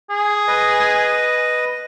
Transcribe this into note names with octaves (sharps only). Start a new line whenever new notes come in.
G#4
B4 D#5